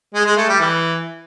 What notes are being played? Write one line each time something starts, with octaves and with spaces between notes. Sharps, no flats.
G#3
G#3
A3
G3
E3